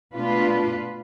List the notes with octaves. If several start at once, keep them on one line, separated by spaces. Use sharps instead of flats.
B2 A3 D4 F4 B4